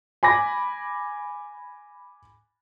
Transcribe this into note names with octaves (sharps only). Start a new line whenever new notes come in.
G#5 B5 D6 A#6